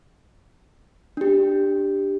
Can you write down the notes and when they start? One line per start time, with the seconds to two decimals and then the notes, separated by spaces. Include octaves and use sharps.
1.17 D4 G4